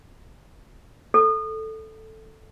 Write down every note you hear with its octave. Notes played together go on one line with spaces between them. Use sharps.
A4